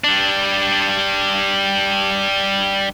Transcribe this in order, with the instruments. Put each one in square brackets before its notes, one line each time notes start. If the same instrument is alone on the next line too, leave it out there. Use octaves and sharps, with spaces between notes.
[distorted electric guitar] G3 D4